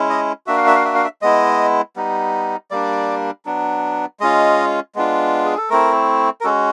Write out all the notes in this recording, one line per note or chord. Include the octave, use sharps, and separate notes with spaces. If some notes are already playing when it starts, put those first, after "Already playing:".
Already playing: G#3 C#4 E4
D#5
A#3 D4 F#4 E5
F5
E5
F5
E5
F5
E5
G#3 B3 E4 D#5
G3 B3 D#4
G3 A#3 D4 D5
F#3 B3 D4
G#3 C#4 F4 D#5
G#3 B3 D4 F4
G#4
A4
A3 C4 E4 A#4
A#4
G#3 C#4 F#4 A4